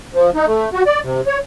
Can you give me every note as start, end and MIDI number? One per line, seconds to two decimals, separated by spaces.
0.14 0.30 53
0.35 0.46 63
0.47 0.69 57
0.73 0.83 66
0.86 1.00 74
1.04 1.21 48
1.27 1.39 73